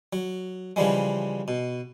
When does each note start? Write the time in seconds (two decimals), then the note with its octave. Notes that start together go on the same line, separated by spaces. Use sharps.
0.13 F#3
0.76 C#3 E3 F3 G3 G#3
1.48 B2